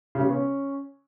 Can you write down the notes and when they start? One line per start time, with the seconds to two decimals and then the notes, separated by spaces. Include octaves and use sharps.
0.15 C#3
0.20 G3
0.25 B3
0.30 C#4